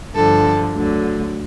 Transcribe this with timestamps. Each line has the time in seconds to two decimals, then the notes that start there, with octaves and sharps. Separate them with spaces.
0.14 G2 D3 F3 A4
0.75 D2 D3 F#3